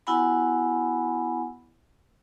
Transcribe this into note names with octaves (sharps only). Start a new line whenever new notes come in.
B3 E4 F#4 F#5 G#5 B5